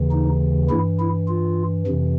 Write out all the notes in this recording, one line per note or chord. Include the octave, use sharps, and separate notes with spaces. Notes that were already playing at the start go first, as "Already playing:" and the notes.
Already playing: D#2 C#3 E3
D#4
G2 E3 E4
E4
F4
F2 C3 E3